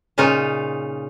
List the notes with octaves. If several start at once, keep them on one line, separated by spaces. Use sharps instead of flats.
A#2 C#3 D#4 F4